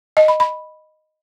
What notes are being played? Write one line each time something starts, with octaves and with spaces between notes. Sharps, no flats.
D#5
B5
B5